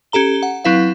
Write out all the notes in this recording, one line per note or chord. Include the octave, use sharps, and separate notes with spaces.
C#4 G4 A4 A#5 G7
F#5
F#3 C4 E4 B4 F5